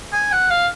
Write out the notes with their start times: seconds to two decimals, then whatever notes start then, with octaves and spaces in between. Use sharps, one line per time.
0.13 G#5
0.32 F#5
0.50 F5